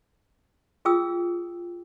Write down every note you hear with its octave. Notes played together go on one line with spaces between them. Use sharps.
F4 G#4 G5 D#6 E6